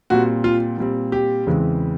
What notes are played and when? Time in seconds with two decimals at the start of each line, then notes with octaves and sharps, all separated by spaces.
0.10 A#2 G3 C4 F#4
0.44 F4
0.78 A#2 G3 C4
1.12 G4
1.47 E2 C#3 E3 G#3 C4